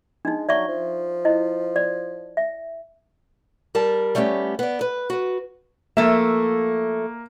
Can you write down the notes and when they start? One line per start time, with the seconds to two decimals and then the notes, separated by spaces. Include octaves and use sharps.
0.25 G#3 D4 D#4
0.49 F#3 D5 E5 C#6
0.68 F3
1.25 E4 D#5
1.76 D5
2.37 E5
3.75 G3 A#4 A5
4.15 G3 A3 B3 C#4 G4
4.59 B3 D5
4.81 B4
5.10 F#4 B4
5.97 F3 A3 A#3 E5